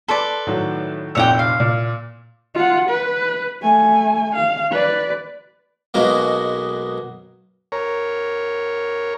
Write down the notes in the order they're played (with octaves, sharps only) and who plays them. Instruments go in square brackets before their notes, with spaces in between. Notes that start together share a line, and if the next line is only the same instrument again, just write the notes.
[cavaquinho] A4 B4 D5 [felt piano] C6
[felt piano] A2 D#3 F#3
[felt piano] F1 A#2 E6 [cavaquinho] C#5 F#5 G5
[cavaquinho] F5
[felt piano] A#2
[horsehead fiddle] F4 F#5
B4
A3 G#5
F5
B4 D5
[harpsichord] B1 B2 G#3 A#3
[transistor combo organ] A#4 C#5